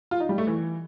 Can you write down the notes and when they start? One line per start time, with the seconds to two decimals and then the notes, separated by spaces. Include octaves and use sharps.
0.11 F4
0.20 D#4
0.29 G3
0.38 A3
0.47 E3